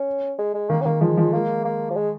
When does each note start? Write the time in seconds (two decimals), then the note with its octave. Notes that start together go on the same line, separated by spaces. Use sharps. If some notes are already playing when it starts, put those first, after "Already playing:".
Already playing: C#4
0.39 G#3
0.54 G#3
0.69 D#3 A#3
0.81 C#4
0.86 D#3 A#3
1.01 F3 G#3
1.17 F3
1.33 G#3 A#3
1.65 A#3
1.90 F3
1.96 G#3